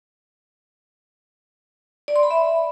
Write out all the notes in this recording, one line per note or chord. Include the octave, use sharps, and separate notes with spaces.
D5
C6
B5
E5